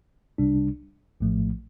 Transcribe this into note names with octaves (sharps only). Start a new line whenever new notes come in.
C2 C3 G3 D4
A#1 A2 F3 A3